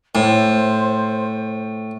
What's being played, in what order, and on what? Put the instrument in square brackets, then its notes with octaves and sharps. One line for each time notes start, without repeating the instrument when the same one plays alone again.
[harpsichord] A2 [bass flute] C5